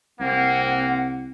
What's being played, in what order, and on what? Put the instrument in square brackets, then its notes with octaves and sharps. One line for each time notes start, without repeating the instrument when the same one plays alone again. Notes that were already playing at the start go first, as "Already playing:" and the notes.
[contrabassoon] C2 [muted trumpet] A#3 [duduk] C4 [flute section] F#5